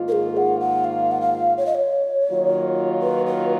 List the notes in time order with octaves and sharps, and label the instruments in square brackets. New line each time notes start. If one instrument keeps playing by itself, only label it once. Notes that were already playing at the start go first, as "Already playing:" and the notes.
Already playing: [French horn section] G#2 D#3 A#3 F4
[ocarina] A#4
G#4
F#5
F#5
F5
F#5
F5
C#5
D#5
C#5
[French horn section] D#3 F#3 A#3 F4
[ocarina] B4
B4